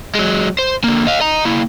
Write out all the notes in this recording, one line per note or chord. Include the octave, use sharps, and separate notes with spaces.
F#3 G#3
C5
D3 A#3
D#5 F5
D#5 A#5
A#3 E4